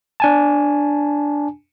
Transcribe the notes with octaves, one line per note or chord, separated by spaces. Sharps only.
D4 G#5 A5